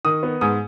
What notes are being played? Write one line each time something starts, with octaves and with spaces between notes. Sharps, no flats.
D#3 D#6
B3
G#2 D#6